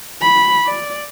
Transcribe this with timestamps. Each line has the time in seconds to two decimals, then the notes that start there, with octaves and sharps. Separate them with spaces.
0.21 B5
0.66 D5